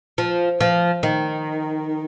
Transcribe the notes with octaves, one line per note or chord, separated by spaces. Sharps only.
F3
F3
D#3